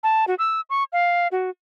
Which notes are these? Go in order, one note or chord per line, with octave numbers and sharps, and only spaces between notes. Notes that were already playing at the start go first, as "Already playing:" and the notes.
A5
F#4
E6
C#6
F5
F#4